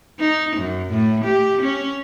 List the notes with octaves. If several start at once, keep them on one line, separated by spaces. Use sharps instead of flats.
D#4
F#2
A2
G4
C#4